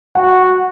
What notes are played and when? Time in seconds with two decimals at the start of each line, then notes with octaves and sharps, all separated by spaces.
0.15 F#4 F#5